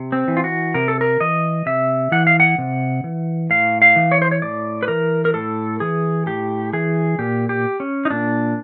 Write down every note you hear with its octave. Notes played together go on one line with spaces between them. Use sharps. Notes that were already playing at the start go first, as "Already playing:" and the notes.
Already playing: C3
C4
E3
F4
F#4
C3 A#4
A4
A#4
E3 D#5
C3 E5
E3 F#5
F5
F#5
C3
E3
A2 F5
F5
E3
C#5
C5
C#5
A2 D5
B4
E3 A#4
A#4
A2 A4
E3 G#4
A2 G4
E3 G#4
A#2 G4
G4
C#4
D#4
A#2 D4